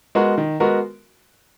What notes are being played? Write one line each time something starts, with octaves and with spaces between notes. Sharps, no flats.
G#3 B3 F#4 A#4
D#3
G#3 B3 F#4 A#4